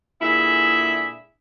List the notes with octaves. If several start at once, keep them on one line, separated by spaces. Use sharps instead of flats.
A#2 D3 G#3 E4 G#4 E5